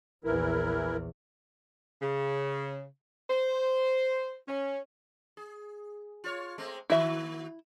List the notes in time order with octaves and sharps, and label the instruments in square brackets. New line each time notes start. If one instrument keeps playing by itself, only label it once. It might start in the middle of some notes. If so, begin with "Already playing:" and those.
[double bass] A#1 E2 [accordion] E3 E4 A#4
[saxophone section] C#3
C5
C#4
[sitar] G#4
F4 C#5
G#3 A3 C4
[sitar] D#3 A#3 F#4 [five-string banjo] E4 E5